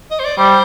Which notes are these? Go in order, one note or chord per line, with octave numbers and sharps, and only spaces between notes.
D#5
C5
D5
G3 C5